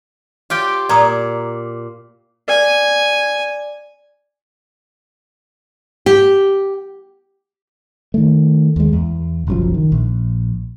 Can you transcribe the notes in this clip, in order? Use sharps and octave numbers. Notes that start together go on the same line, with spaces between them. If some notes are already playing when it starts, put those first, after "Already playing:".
F4 G4 C#5 G5
A#2 D5 A#5 D#6
D5 G#5
G4
D#3 A3
D#2 G#3
E2
F#1 B1 F#2 F3
D#3
A#1